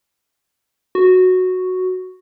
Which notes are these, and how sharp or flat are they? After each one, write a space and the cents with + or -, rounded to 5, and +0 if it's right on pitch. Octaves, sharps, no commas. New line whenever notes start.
F#4 -5